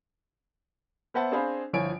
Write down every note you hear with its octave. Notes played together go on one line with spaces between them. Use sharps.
B3 B4 C5 E5 F#5 A5
C4 D4 G#4 C5 F5 B5
G1 F3 E4 C#5 G#5 D7